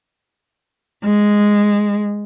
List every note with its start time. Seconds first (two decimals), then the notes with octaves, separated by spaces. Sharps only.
1.03 G#3